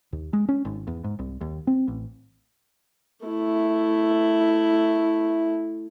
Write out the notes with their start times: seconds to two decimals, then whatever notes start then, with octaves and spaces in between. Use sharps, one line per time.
0.13 D#2
0.33 G#3
0.49 C#4
0.65 G#1
0.87 E2
1.04 G#2
1.19 C2
1.41 D#2
1.67 C4
1.88 A1
3.26 A3 E4